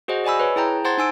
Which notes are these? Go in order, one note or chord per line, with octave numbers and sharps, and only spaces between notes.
F#4 G#4 C5 D#5 F#5
D5 D#5 G#5 B5 E6
B4 C#5
E4 G#4 G5 A5 A#5 G6
C5 F#5 A5 C6 G#6 A6
D#4 G#5 E6 D7